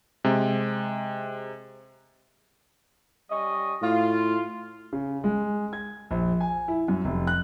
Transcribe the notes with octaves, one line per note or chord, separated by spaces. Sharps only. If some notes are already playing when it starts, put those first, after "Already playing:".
C3 G#3
G3 C#4 D#5
A2 F4
C#3
G#3
G#6
A#1
G#5
E4
F#2
F1
F#6